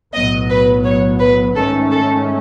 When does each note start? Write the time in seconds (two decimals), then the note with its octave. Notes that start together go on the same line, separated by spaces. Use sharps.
0.13 B1 A2 F#3 B3 D#5
0.49 B4
0.84 C#5
1.20 B4
1.55 G#2 D#3 A3 C#4 A4
1.90 A4